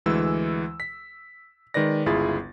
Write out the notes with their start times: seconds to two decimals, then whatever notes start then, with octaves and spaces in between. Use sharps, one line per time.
0.06 D2 E3 G#3 E6
0.80 B6
1.74 D#3 G#3 B4 D5 A#6
2.06 G1 C#2 E4 F4 G#4 A6